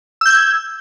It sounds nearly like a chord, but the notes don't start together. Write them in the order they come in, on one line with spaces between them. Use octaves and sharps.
E6 G6 G#6